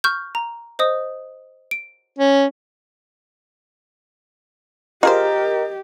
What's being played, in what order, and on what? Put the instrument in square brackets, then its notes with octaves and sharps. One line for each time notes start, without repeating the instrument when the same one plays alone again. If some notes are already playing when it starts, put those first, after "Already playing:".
[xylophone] C#6 F6 G6
A#5
C5 D#5 D#6
D7
[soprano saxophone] C#4
[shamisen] F4 G#4 C5 [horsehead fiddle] G4 [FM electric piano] A#4 [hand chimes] D#5